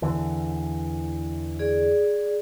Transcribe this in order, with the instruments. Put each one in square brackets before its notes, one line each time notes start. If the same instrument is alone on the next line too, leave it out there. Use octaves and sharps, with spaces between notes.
[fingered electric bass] E2 D3 E3
[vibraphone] G#4 D5